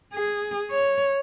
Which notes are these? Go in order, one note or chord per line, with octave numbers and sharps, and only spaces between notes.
G#4
C#5